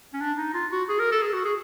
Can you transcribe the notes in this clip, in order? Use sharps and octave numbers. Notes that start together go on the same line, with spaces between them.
C#4
D4
D#4
F4
F#4
G#4
A#4
A4
G#4
F#4
G#4